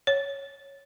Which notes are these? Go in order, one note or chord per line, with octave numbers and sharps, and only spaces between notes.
C#5